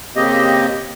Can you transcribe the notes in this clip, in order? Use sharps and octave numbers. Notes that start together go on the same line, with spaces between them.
C#3 A#3 C4 G4 D#5